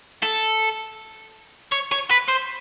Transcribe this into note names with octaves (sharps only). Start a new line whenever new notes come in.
A4
C#5
C#5
B4
C5